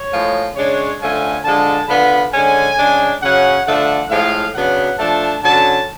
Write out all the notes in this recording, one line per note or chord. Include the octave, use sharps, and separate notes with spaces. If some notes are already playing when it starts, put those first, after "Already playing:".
Already playing: C#5
A2 F3 G#3
C#3 G#3 D4 C#5
D3 F3 A3 C#4 G#5
D3 F3 G#3 D4 A5
D3 F3 B3 D4 B5
D3 G#3 C#4 G#5
C#3 G#3 D4
C#3 F#3 C#4 F#5
D3 F3 A3 D4 F#5
A2 F3 G#3 F5
C#3 F#3 B3 D4 F#5
F3 A3 D4 A5
D3 F#3 C#4 A5